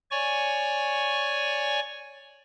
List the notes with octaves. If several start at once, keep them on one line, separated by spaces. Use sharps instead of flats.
C#5 D5 G#5 C#6